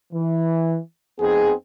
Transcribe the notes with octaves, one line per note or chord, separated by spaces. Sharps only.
E3
F2 B3 C4 D#4 G#4